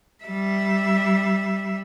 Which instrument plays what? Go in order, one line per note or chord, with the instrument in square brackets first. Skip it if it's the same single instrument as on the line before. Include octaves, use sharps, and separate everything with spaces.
[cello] G3 E5